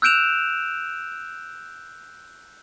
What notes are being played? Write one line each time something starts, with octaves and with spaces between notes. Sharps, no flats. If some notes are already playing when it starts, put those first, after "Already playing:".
E6 F#6 G6 D7 E7 F7